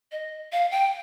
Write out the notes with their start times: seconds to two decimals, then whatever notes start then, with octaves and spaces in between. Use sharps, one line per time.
0.12 D#5
0.52 F5
0.71 G5